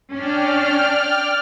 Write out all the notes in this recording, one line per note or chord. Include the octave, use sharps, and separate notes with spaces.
C#4 D4 D5 G5 F6